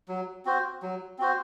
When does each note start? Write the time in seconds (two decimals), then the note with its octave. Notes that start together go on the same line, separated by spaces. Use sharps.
0.08 F#3
0.45 C4 F#4 C5
0.82 F#3
1.19 C4 F#4 C5